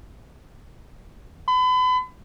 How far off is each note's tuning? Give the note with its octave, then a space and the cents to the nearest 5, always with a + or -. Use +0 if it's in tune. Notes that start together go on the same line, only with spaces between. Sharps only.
B5 +35